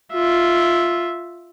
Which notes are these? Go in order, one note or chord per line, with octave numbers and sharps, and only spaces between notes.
F4 E5